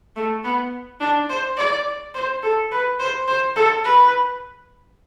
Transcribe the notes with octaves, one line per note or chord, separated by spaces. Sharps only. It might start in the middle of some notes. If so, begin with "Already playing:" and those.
A3
B3
D4
C5
D5
C5
A4
B4
C5
C5
A4
B4